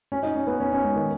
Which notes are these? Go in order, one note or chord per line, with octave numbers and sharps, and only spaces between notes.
C#4
D#4
C#4
B3
C#4
C#4
G#3
D#3